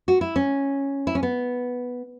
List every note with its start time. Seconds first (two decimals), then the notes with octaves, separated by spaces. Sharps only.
0.08 F#4
0.21 E4
0.36 C#4
1.07 E4
1.15 C#4
1.23 B3